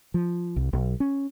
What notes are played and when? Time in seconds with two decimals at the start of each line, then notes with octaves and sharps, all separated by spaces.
0.14 F3
0.56 C2
0.73 B1
1.00 C#4